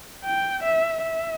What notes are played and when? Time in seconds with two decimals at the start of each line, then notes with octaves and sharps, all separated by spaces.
0.25 G5
0.63 E5
1.02 E5